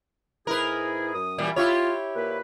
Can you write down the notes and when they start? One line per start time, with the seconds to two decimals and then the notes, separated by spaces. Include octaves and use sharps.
0.47 G#2 E4 G#4 A#4 B4
1.13 F#2 D#6
1.38 A#2 E3 G3
1.56 E4 F4 G4 C#5
2.16 A#2 B4